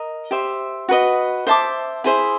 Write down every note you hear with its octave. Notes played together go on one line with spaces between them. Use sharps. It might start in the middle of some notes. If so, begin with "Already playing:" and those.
Already playing: A#4 D#5
G4 C5 E5
F#4 B4 D#5
C5 E5 A5 D6
E4 G#4 C5 E5